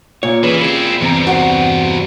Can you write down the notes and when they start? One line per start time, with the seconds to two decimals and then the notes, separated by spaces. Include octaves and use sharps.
0.23 A#2 C#5
0.43 E3 C#4 G#4 B4
0.61 C4 E4 G#4
1.01 E2 G2 C3 C4 A#5
1.27 F#4 F#5